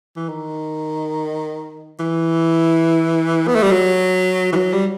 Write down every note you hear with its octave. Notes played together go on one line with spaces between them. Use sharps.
E3
D#3
E3
B3
A3
G3
F#3
E3
F#3
G3